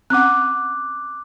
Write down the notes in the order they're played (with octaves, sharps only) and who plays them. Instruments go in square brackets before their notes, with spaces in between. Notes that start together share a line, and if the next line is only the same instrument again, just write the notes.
[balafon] C4 C#4 F#5 [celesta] D6 F#6